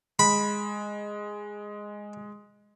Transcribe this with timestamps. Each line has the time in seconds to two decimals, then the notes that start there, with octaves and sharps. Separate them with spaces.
0.19 G#3 B5